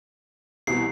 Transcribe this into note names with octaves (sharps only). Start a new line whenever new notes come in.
C2 B2 E3 C7